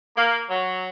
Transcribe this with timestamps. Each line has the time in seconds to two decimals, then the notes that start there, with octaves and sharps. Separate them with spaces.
0.17 A#3
0.49 F#3